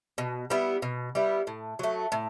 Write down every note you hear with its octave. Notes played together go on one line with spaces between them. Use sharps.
B2
G3 B3 E4
B2
G3 B3 E4
A2
F#3 A3
A2